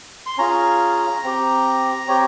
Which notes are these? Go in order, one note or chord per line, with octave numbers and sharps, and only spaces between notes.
C6
C#4 F4 G#4 A#5
C4 G4
C4 G4 C#5